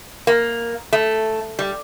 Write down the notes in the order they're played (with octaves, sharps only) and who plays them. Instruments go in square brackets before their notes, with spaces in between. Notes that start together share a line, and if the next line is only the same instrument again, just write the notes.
[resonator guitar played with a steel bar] A#3
A3
G3